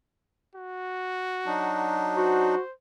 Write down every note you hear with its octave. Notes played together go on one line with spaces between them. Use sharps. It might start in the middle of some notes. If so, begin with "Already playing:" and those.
F#4
F#3 D4 D#4
F#4 C5